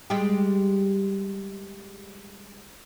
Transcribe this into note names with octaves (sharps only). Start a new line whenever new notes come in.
G3 G#3 G4